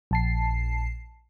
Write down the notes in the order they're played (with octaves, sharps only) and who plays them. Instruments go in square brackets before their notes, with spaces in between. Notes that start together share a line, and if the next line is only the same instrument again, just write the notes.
[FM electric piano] A#1 A5 C7